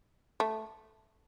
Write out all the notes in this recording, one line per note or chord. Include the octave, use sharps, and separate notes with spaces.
A3